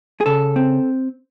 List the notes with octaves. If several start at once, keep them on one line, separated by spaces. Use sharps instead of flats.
G#4
C#3 A4
C4